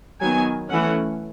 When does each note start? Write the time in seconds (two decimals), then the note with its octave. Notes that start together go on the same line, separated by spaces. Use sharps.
0.22 D#3 F#3 B3 G#5
0.69 E3 A3 C#4 F#5